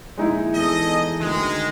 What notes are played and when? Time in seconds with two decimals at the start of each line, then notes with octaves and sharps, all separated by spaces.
0.18 A#1 G#3 D#4 E4
0.55 E2 G#4 A4 D#5
1.21 D2 D#3 G#3